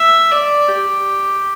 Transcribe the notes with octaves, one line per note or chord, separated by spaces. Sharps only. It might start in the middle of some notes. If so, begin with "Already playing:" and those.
Already playing: E5
D5
G4